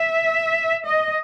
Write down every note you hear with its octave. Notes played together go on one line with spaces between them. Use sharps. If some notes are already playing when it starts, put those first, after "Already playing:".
Already playing: E5
D#5